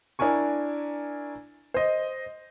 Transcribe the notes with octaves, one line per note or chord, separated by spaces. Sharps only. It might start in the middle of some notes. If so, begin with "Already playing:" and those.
D4 E4 A#4 G#5 C#6
C5 D#5